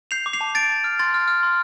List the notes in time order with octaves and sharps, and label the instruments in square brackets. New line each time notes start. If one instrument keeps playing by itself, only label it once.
[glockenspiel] G6 C7 F7
D6
C7 F7
A5
A5 A6 D7
A5
F6
C6 A6
F6
F6
C6